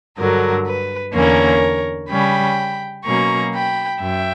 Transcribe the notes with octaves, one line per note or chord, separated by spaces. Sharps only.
G2 D3 F#3 A#4
B4
E2 D3 A#3 C#4 A#4 C#5
C#3 G3 C#4 G5 B5
B2 F#3 A#3 C#4 A#5 C#6
G5 B5
F#2 E5 G5